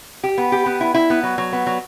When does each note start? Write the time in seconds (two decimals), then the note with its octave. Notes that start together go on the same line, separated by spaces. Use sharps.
0.23 G4
0.38 B3
0.52 G4
0.66 B3
0.81 E4
0.94 E4
1.10 B3
1.23 F#3
1.38 F#3
1.52 B3
1.66 F#3